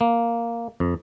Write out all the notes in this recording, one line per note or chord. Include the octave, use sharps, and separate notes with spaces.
A#3
F2